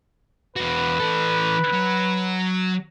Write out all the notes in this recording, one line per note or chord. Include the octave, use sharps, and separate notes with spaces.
E2 F#4 B4
E3 A4
F#3